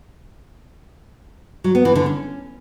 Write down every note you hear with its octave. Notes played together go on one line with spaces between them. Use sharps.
F#3
B3
E3
D3
C#4